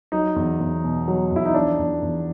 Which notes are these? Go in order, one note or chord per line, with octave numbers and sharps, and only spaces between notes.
F#3 D#4
E2
E2
B2
F#3
E2 E4
D#4
F3 D4
E2
E2